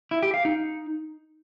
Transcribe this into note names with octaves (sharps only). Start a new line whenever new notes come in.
E4
G4
F5
D#4